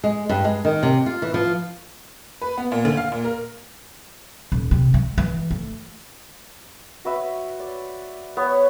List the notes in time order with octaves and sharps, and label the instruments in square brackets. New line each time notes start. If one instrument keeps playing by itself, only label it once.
[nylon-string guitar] G#3
G2
G#3
D#3
C3
F4
E3
F3
[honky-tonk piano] B4
B3
A#2
D2
F5
A#2
A#4
[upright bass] D#1
C3
G#3
E3
A3
[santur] F#4 B4 E5
D5
B3 C#5